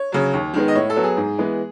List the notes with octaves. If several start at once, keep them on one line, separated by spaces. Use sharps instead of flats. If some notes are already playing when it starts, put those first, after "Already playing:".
Already playing: C#5
C#3 F#3
D#2
D#3 G#3 B3
D#5
A2 C#5
A4
F#3 B3
G#4
G#2
E3 G#3 B3